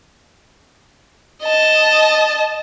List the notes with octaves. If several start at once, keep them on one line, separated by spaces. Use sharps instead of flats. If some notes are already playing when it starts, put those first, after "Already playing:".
D#5 A5